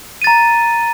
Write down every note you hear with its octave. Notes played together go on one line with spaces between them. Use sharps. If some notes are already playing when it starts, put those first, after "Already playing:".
A#5 A6 D#7